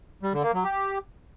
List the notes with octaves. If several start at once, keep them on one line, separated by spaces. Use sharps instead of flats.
G3
D3
A#3
F#3
G4